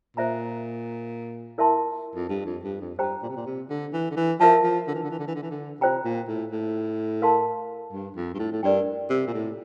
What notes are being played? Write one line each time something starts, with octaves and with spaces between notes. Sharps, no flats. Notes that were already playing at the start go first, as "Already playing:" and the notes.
A#2 C5 E5 A#5
E4 A#4 E5 A5 C6
F2
G2
F2
G2
F2
G2 G4 C5 G5 A#5
A#2
C3
A#2
C3
D3
E3
D3
E3
F3 A#4 E5 A5
F3
D3
E3
D3
E3
D3
E3
D3
E3
D3
C3 F4 C5 G5 A#5
A#2
A2
A2
A#4 F5 A5 C6
G2
F2
G2
A2
A2
G2 A#4 D5 G5
C3
A#2
A2